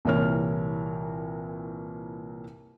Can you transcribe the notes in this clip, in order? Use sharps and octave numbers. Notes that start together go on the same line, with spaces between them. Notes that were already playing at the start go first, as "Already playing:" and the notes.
C2 A#2 E3 A#4 C#5 F6